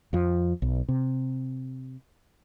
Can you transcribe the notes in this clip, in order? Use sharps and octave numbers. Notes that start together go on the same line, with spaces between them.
F2 F3
B1
C3